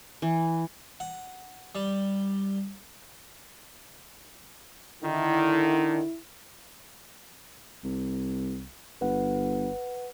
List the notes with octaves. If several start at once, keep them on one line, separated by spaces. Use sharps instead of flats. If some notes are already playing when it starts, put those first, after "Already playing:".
E3
F#5
G3
D3 D#3 E4
C2
G1 B4 F#5